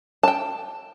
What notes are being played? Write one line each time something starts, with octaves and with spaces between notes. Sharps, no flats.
G5 A5